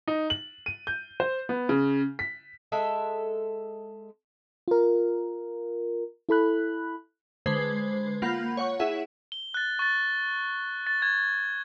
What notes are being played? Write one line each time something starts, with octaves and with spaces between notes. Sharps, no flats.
D#4
F#7
D#7
G6
C5
B3
C#3
B6
G#3 A4 E5
F4 A#4
E4 A4 B5 F#6
D3 G#3 B4 C5 G#6 C7
A#3 F4 F#5 B5 G6
C#5 F#5 C#6
E4 G#4 E5 F#5
G7
F#6 A6
C#6 A6
A6
G#6